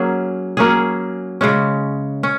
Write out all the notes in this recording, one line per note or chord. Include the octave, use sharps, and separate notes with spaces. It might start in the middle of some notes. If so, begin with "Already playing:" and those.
Already playing: F#3 A#3 C#4 G#4
F#3 A#3 C#4 G#4
C#3 G#3 C#4
C#4